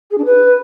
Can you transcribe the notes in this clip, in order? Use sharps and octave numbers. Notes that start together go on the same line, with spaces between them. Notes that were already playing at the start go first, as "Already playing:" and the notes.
G#4
D4
B4